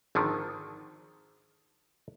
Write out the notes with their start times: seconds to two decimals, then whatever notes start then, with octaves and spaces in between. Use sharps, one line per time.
0.15 G#1 D3 D#3 F3